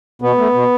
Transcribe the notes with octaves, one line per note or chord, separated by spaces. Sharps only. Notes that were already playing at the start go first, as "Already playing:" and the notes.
B2 B3
A3
B2